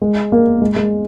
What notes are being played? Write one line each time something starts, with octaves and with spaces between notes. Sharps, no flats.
G#3
A#3
G#3
G#3